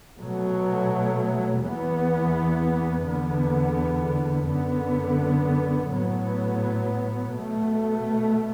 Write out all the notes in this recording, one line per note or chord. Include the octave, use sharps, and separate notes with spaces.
B2 F#3 A3
E2 E3 B3
E2 D3 B3
F#2 D3 B3
A2 F#3 B3
B2 A3